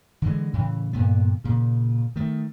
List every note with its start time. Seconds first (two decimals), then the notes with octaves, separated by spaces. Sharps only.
0.22 D3 E3 G#3
0.54 A2 C#3 E3
0.93 G2 A#2 D3 B3
1.44 A#2 C#3
2.16 D#3 A3